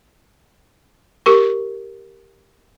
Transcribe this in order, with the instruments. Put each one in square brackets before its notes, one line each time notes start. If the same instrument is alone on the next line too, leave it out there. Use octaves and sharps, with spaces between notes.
[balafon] G4 A#4 C#6